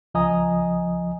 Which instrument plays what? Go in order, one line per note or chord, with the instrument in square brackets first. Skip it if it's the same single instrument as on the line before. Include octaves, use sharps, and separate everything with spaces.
[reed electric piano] C#2 F3 D#5 G#5 A#5 D#6